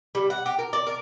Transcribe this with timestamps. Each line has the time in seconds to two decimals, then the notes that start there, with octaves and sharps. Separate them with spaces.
0.15 G3
0.30 F#5
0.46 G4
0.59 A#4
0.73 D5
0.87 A#4